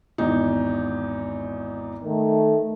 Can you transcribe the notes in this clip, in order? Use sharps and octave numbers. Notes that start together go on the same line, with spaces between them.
G#1 E2 D#4
D#3 A3